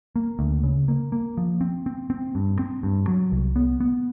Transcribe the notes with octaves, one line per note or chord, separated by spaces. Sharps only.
A#3
D2
C#3
A#3
A#3
F3
C4
C4
C4
G2
C4
G2
F#3
C2
B3
B3